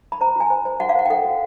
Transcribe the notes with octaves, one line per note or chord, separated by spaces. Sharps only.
B5
C5 A#5
F#4 G#5
C5
C5
F#4 F#5
F5
C5 F#5
G5
A4 F#5
F#4